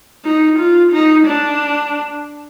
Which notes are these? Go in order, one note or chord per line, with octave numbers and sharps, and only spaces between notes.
D#4
F4
D#4
D4